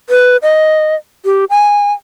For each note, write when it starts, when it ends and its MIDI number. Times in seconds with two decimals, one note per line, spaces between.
0.10 0.37 71
0.43 0.95 75
1.25 1.45 67
1.50 1.92 80